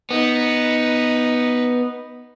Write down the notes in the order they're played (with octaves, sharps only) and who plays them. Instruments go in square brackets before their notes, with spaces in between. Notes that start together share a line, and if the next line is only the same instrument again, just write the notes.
[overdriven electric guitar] B3 [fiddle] D#4 B4